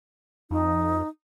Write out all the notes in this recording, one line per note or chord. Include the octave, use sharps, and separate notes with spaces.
F2 D#4